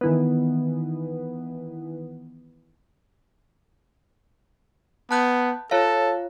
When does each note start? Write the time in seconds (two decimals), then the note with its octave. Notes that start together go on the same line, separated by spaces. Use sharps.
0.01 D#3 E3 B3
5.11 B3 A5 F#6 G6
5.71 F4 A4 C#5 F5